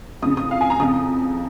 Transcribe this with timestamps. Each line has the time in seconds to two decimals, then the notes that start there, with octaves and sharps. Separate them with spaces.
0.22 F2 C#3 D#6
0.37 D#6
0.51 F5
0.61 G#5
0.70 A#5
0.80 F2 C#3 D#6